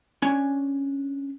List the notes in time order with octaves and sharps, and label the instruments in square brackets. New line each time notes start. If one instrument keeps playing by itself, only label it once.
[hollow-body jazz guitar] C#4 D4 G#5